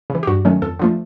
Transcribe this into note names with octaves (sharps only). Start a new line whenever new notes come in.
C#3 E3
G4
G2 F#4
D#3 F#3 A3 C#4
F2 A4
D3 F3 A3